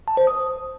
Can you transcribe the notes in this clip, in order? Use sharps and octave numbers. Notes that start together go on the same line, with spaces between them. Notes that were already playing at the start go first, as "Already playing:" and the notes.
A5
C5
D#6